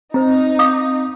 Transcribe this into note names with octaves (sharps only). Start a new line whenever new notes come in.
C4 D#4 C5 A#5
F5 D6 D#6